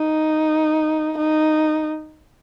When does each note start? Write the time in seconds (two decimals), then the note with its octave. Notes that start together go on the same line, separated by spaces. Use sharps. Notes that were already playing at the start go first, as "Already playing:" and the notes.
Already playing: D#4
1.17 D#4